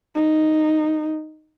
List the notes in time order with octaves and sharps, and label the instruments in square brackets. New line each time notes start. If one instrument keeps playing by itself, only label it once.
[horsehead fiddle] D#4